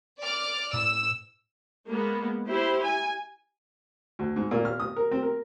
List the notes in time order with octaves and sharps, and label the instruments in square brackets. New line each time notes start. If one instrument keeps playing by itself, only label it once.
[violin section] D5 D6 F6
[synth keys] A2 [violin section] E6
[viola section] G#3 A#3 B3
E4 G4 C5
G#5
[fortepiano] D2
G#2
A#2
F6
D#6
A#4
C4
A#4